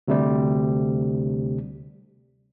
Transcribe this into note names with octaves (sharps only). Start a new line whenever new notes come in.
D2 C3 G3